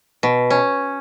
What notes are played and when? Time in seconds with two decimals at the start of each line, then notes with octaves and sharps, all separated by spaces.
0.23 B2
0.50 C#4